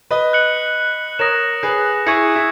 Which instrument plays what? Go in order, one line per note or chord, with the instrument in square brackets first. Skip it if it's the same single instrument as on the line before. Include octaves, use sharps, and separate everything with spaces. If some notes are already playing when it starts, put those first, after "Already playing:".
[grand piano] B4 D#5
[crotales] F#6 C#7 F#7
[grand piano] A#4 C#5 [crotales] D#6 A#6 E7
[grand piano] G#4 B4
[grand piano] E4 G#4 [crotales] C#6 G#6 C#7
[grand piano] E4